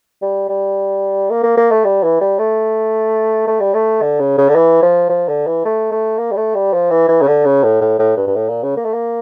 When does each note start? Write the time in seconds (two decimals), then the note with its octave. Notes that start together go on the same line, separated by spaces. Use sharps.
0.22 G3
0.49 G3
1.30 A#3
1.43 A#3
1.57 A#3
1.71 A3
1.84 G3
2.03 E3
2.21 G3
2.39 A3
3.47 A3
3.60 G3
3.74 A3
4.01 D3
4.20 C#3
4.38 C#3
4.49 D3
4.55 E3
4.83 F3
5.10 F3
5.29 D3
5.47 E3
5.65 A3
5.92 A3
6.18 A#3
6.31 G3
6.37 A3
6.55 G3
6.73 F3
6.91 E3
7.08 E3
7.22 C#3
7.28 D3
7.45 C#3
7.64 A2
7.81 A2
7.99 A2
8.17 G2
8.27 G2
8.36 A2
8.49 A#2
8.63 C#3
8.77 A#3
8.85 A3
8.93 A#3